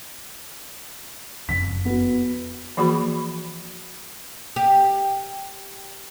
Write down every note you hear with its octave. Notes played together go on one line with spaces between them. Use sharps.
F#1 F2 B6
B3 F#4
E3 F3 A#3 F#4 G#4 B5
G4